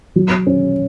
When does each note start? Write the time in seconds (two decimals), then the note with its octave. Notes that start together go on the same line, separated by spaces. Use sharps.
0.16 F#3
0.47 C#4